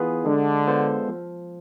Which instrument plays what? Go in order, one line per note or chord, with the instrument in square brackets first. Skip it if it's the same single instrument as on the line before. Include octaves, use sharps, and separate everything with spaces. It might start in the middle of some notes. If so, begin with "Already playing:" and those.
Already playing: [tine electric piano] E3 B3 F4 G#4 B4
[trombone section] D3 [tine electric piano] G#3
[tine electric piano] B3 F4 A4 C5
F3